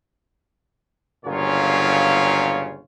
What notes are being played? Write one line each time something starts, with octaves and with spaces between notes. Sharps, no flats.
G1 A#2 C#3 F#3 F4 C#5